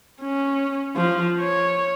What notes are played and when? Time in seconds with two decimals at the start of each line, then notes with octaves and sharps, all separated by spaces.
0.22 C#4
0.96 F3
1.41 C#5